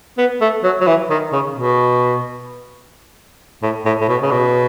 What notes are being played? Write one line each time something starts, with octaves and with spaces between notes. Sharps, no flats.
B3
A3
F#3
F#3
E3
D#3
C#3
B2
A2
A2
A2
B2
C#3
B2